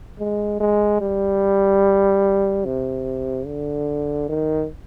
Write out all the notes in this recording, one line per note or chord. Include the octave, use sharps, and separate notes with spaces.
G#3
G#3
G3
C3
D3
D#3